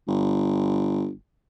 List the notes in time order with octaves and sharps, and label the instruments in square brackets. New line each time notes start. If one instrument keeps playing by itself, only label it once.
[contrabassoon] G1